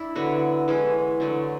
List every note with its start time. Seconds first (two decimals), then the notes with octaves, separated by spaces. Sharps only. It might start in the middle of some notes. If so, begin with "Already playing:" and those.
Already playing: D4 E4
0.15 D3 F#3 B3 F#4
0.68 E3 G#3 C#4
1.20 D3 F#3 A3